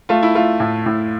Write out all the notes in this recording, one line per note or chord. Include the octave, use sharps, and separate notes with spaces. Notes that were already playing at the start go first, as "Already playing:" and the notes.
A3 F4
E4
A3 F4
A2
A2